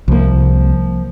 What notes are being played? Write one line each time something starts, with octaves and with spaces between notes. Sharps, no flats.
C2 F3 A#3